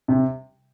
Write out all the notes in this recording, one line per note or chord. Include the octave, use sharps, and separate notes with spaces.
C3